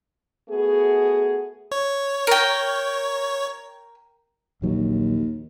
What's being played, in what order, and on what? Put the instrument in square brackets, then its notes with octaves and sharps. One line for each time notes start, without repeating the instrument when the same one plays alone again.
[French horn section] A3 B3 F#4 G#4
[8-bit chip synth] C#5
[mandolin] A#4 G5
[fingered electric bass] A#1 F#3 [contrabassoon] D#2